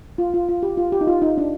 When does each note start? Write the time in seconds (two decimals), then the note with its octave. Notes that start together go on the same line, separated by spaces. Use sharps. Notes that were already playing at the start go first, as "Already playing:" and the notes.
0.18 F4
0.34 F4
0.49 F4
0.63 G4
0.77 F4
0.92 G4
1.01 D#4
1.07 F4
1.22 D#4
1.38 D4